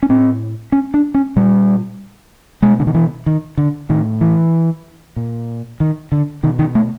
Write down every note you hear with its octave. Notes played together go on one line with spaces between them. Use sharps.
C#4
A2 C4
C#4
D4
C#4
A#2 G3
B2 G#3
D3
D#3
E3
D#3
D3
A2 D#3
E3
A#2
D#3
D3
B2 D#3
D#3
A3